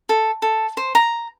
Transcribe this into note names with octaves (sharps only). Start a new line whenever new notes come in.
A4
A4
C5
A#5